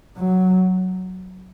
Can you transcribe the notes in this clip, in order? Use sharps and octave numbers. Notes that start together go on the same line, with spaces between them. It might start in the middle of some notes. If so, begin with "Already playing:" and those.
F#3